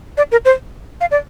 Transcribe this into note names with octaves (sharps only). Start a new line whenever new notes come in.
D5
A#4
C5
F5
D5